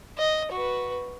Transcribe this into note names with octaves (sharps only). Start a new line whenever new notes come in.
D#5
F#4 B4